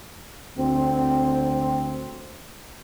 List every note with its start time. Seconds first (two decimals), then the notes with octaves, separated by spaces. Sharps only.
0.57 D2 C4